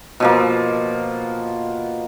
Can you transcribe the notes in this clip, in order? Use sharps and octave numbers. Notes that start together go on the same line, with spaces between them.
B2 F3 A#3